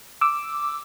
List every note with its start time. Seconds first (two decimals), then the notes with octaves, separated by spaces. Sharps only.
0.21 D6 E6